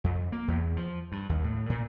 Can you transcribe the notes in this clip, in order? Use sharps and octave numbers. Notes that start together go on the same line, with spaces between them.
F2
A#3
E2
F3
G2
D#2
A2
A#2